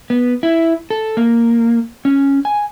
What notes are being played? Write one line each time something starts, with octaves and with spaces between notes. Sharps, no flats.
B3
E4
A4
A#3
C#4
G#5